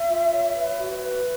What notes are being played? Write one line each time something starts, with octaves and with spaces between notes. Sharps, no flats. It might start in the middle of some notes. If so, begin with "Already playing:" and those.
Already playing: E5
F4
C#5
B4
F#4
B4